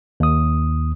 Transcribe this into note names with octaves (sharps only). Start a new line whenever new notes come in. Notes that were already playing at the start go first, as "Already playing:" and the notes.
D#2 D#6